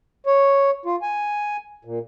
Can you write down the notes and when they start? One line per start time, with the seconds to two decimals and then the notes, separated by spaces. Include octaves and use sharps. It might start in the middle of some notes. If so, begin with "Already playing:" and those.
0.26 C#5
0.85 F4
1.02 G#5
1.85 A#2